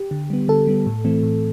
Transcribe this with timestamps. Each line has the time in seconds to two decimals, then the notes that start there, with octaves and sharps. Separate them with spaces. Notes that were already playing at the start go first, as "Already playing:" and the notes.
Already playing: G4
0.11 D3
0.30 G3 B3
0.48 D3 A4
0.67 G3 B3
0.86 A2
1.05 E3 A3 C4
1.23 A2